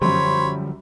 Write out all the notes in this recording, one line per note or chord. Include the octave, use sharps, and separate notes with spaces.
F#2 D3 F3 G3 C5 C#5 B5